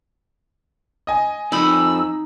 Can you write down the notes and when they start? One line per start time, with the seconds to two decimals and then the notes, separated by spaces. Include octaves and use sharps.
1.07 D#5 G#5
1.52 F2 D#4 B5 E6